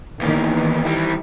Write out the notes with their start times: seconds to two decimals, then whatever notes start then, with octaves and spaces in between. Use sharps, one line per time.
0.21 E2 D#3 E3 A#3
0.85 G3 E4